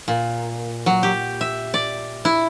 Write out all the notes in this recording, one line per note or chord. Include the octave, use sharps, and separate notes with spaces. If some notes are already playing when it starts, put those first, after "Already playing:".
A#2
F#3
G4
E5
D5
E4